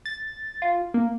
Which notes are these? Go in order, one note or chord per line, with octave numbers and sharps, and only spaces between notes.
A6
F4
A#3